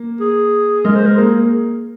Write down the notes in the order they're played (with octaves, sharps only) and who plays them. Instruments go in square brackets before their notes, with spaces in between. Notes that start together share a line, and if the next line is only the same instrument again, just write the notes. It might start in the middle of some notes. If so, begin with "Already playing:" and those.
Already playing: [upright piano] A#3
[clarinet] G#4
[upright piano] G#3 [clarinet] A#4
[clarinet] C5
A#4
[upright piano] A#3 [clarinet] G#4